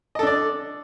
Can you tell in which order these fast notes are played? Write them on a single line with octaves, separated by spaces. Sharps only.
D#5 A4 D4 D5